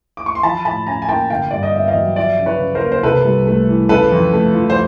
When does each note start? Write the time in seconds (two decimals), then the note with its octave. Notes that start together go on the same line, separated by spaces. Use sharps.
0.17 D6
0.26 C#6
0.35 C6
0.43 F3 A5 B5
0.65 A2 A5 B5
0.87 C#4 G#5 A#5
1.02 G#5
1.08 A#3 G5 A5
1.30 D3 F5 G5
1.51 G2 D5
1.63 D#5
1.74 B3 E5
1.88 D#5 F5
1.95 F#3
2.16 F3 D5 E5
2.39 C#3
2.46 B4 C#5
2.60 C#3
2.75 A#4 C5
2.81 A#3
2.92 C5
3.03 C3 A4 B4
3.25 C2
3.47 A3
3.68 E3
3.89 C#3 A4 B4
4.12 F2
4.33 A3
4.54 F3
4.70 C5